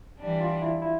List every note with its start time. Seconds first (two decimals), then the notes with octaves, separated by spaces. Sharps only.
0.20 E3 G3 D4
0.41 F4
0.62 E4
0.82 E4